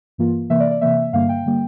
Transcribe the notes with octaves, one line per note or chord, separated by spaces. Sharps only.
G2 E3 A#3 F4
C3 E3 A#3 E5
D5
D5
C3 E3 A#3 E5
G2 D3 G3 A#3 F5
G5
D3 G3 A#3